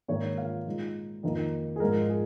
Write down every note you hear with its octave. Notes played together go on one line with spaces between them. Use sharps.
G#2 D#3 A#3 C#5
F5
A#2 G#3 D#4
F2 D#3 A#3 D#4
G#4
G#2 F3 G#3 D#4 A#4
G#4